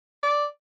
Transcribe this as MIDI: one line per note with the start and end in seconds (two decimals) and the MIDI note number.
0.23 0.45 74